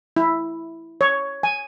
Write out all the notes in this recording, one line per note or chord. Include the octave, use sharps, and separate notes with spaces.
E4
C#5
G#5